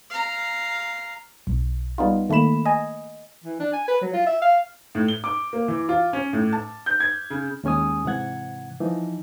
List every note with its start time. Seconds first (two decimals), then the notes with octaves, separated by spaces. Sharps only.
0.10 F5 A#5
1.47 B1
1.98 G3 B3 D#4 F4
2.29 D#3 A3 A#3 B5 E7
2.65 D#5 G#5
3.44 E3
3.60 D4
3.73 G#5
3.88 B4
4.02 F#3
4.13 F4
4.26 E5
4.42 F5
4.95 A2
5.08 G7
5.24 D6
5.53 A#3
5.68 E3
5.89 F4
6.13 C#4
6.33 A2
6.53 A5
6.86 G6
7.00 G#6
7.30 C#3
7.64 D#2 G#3 C#4 G#5 D#6
8.05 G#2 C3 E3 F#5 G#6
8.81 E3 F3 D#4